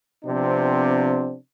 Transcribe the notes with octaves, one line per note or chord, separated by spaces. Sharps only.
C3 F3 B3 C4 D4